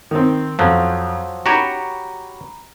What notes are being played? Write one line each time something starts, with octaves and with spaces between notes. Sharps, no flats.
D#3 C4
F2 F3 F#3
F#4 G4 C#5 A#5 B5